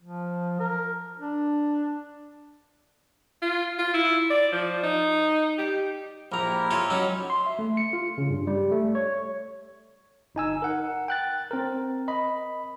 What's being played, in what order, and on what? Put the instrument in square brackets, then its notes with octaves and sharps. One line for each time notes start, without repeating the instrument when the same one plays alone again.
[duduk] F3
A#4
D4
[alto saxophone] F4
F4
E4
D5
F3
D#4
G4
[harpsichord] A#1 A#5 [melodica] E4 G4 A#4
[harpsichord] F4 A4 C#5
F#3 C#4 D#4
[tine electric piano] C6
E5
A3
C#7
F4
C#3
G2
G3
A3
C#5
G1 D#4 G#5 E6
A#4 F#5
G5 F#6 A6
C4 A#4
D#5 B5